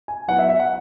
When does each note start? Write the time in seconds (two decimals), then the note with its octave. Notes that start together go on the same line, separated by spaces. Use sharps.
0.08 G#5
0.28 F#3 B3 E4 F#5
0.39 E5
0.49 E5
0.60 F#5